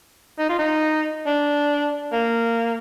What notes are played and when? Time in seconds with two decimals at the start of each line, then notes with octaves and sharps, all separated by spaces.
0.39 D#4
0.49 F4
0.59 D#4
1.26 D4
2.13 A#3